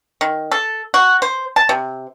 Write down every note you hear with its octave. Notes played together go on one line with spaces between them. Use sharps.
D#3
A4
F#4
C5
A5
C3